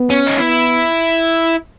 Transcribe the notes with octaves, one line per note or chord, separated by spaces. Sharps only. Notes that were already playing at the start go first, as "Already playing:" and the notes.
Already playing: B3
C#4
D#4
B3 E4